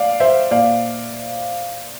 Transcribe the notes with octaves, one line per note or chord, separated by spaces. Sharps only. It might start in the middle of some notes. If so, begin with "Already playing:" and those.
Already playing: D5 F5
C5 E5
A#2 D5 F5